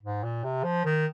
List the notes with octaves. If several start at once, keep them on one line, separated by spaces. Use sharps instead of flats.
G#2
A#2
C3
F3
D#3